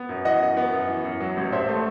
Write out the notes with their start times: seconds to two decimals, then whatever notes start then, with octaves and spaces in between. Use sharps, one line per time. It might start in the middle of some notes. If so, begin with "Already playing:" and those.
Already playing: B3
0.09 F#2
0.25 E3 D#5 F#5
0.41 F#2
0.57 B3
0.73 F#2
0.88 E3
1.05 F#2
1.20 F#3
1.36 A1
1.52 G2 C5 E5
1.68 A3